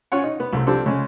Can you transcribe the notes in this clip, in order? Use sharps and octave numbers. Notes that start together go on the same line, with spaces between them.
C#4 F4 C#5 F#5
D#4
B3
C2 A3 C4
F3 G3 C4 D4 A4
C#3 G#3